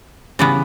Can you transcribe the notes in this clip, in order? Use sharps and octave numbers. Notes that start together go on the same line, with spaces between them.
C#3 E3 G3 B3